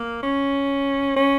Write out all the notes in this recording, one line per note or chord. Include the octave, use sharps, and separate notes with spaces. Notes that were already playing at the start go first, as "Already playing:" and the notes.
Already playing: A#3
C#4
C#4